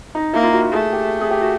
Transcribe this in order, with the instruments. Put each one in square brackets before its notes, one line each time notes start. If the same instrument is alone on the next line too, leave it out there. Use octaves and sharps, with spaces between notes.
[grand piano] D#4
[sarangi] A#3 [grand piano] E4
[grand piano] F4
F#4
F#4
[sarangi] A3 [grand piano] G#4
[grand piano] G4
G#4
G4
F#4